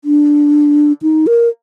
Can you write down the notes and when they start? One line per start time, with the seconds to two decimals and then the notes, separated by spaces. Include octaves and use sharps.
0.05 D4
1.02 D#4
1.27 A#4